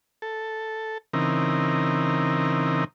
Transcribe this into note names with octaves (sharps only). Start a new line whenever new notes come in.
A4
C#3 E3 C4 D#4 A#4